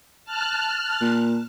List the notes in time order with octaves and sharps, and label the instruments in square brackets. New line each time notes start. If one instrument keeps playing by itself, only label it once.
[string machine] A5 F6 F#6
[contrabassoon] A#2